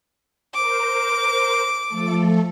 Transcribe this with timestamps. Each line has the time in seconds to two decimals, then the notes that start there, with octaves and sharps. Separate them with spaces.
0.54 A#4 C5 D6
1.88 F3 A3 A4